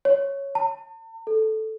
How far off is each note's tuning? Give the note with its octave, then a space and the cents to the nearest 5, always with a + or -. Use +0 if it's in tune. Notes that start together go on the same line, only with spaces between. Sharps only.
C#5 -5
A5 +45
A4 -10